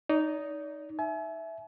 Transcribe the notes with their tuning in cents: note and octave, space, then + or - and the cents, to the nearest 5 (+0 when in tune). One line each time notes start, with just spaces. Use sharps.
D#4 +0 D5 -40
E5 +0 G#5 +40